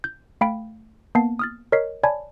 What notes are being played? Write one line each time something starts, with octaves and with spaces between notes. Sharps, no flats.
G6
A3 F5 G5 B5 B6 D7
A#3 B3 A5 C7
D#6 F6 A6
A#4 C#5 D#5 B6 C7
C#5 D5 G#5 A5 B5 G#6